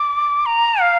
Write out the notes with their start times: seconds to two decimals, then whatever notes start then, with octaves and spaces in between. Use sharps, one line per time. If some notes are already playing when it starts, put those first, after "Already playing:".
Already playing: D6
0.46 A#5
0.81 F5